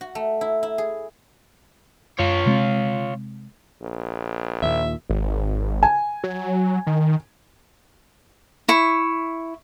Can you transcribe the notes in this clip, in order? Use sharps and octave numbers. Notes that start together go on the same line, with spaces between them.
F#4
A3
E4
E4
G#4
F#2 F4 C#5
C3 G#3 C4
A#1
D#2 A#2 E5
G#1
G#5
F#3
D#3
E4 C#6